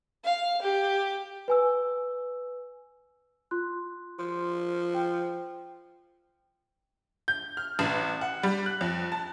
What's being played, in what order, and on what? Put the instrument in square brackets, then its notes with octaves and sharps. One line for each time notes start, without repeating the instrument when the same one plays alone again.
[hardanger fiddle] F5
G4
[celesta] B4 G#5 E6
F4 C6 F#6
[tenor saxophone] F3 [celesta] C6
[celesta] G5
[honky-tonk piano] G6
F6
A1
F#5
G3
F#6
F2
A5